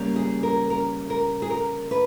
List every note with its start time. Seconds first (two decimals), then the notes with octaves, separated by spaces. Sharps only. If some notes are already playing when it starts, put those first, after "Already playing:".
Already playing: C#3 G3 A#3
0.16 G#4
0.43 A#4
0.70 A#4
1.10 A#4
1.42 G#4
1.50 A#4
1.91 B4